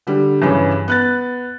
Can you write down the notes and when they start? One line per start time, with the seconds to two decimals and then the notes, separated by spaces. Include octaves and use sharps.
0.07 D3 G3
0.42 G2 C#3 E3 C#4
0.88 B3 F#6 A6